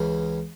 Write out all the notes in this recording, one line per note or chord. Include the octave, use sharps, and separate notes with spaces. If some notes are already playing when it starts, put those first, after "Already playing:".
Already playing: C#2 C#3 E3